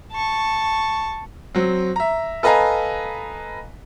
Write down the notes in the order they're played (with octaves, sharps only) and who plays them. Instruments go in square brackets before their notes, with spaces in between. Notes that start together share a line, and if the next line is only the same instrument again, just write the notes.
[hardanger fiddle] A5 C#6
[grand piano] F#3 C4
E5 A#5
A4 B4 D#5 F5 G#5 A#5